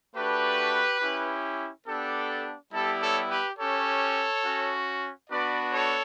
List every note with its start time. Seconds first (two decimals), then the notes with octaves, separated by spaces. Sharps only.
0.15 A3 D4 F#4 G4 B4
1.01 C#4 E4 G4
1.87 B3 D4 G4 A4
2.73 G3 B3 E4 G4 A4
3.01 A4 C#5
3.30 G4 B4
3.58 C#4 G4 A4 C#5
4.44 C#4 F#4
5.30 B3 D4 F#4 B4 D5
5.72 A4 C#5